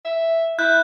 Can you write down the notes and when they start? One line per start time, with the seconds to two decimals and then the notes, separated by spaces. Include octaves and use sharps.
0.05 E5
0.59 E4 F#6 G6